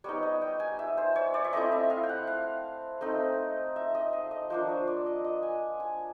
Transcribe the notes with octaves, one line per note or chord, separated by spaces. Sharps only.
G3 B3 D#4 C#5
D#5
G5
G#5
E5
C5
C#5
D5
E5
A3 C4 E4 D#5
E5
F5
G5
F#5
F5
A3 C4 D#4
E5
D#5
F5
D#5
F3 A#3 D4 C5
C#5
D5
D#5
D#5
G#5
G#5